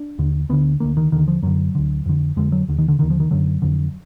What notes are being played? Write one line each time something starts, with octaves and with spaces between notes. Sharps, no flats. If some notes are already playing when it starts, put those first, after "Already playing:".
Already playing: D4
D#2 D3
D2 D3 B3
D2 D3 A#3
D#3
D#2 D3 D#3
F3
F#2 D3 F#3
D2 D3
F2 D3
F2 D3 G#3
F#3
D#2 D3
D#3
D3
D#2 D3 D#3
F3
D#3
F#2 D3 F#3
F2 D3